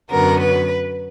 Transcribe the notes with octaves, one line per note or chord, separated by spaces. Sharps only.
F#2 D3 F#3 B3 A#4
B4